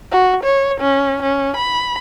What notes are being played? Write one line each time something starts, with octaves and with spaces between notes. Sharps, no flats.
F#4
C#5
C#4
C#4
B5